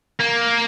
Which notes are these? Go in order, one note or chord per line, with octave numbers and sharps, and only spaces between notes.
A#3